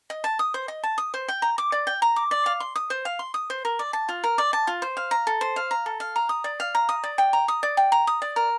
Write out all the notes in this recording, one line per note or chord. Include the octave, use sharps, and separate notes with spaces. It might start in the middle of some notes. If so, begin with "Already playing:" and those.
D#5
A5
D#6
C5
D#5
A5
D#6
C5
G5
A#5
D6
D5
G5
A#5
D6
D5
F5
C6
D#6
C5
F5
C6
D#6
C5
A#4
D5
A5
F4
A#4
D5
A5
F4
C5
F5
A#5
A4
C5
F5
A#5
A4
F5
A#5
D#6
D5
F5
A#5
D#6
D5
G5
A#5
D#6
D5
G5
A#5
D#6
D5
A#4